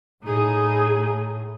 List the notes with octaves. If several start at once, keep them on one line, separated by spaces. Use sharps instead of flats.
A2 D#4 G#4